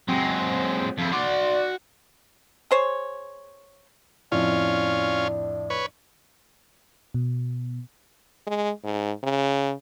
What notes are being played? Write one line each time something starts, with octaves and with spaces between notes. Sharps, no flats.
F#3 G#3 C4
F2 E4
F#4 D5 C6
G#4 C5 C#5
F2 A2 C#4 D4 F4
B4 C#5
B2
G#3
G#2
C#3